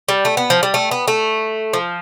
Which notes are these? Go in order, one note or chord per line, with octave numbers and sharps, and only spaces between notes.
G3
A3
B3
F3
G3
A3
B3
A3
F3